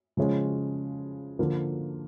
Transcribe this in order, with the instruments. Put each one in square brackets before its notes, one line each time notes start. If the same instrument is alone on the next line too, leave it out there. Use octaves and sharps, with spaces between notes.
[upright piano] C#3 F3 G#3 C#4
D3 F3 A#3